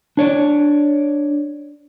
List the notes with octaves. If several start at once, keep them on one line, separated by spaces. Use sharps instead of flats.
D4 C#5 D5